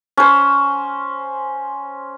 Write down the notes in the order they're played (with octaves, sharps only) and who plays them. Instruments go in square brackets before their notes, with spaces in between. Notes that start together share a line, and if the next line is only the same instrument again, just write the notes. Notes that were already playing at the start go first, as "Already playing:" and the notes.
[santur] C#4 C5